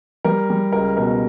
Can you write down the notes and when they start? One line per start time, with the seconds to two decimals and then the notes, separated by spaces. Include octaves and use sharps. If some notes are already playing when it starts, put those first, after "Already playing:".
0.24 G3 A#4
0.50 G3
0.72 C#2 A#4
0.97 B2 A#4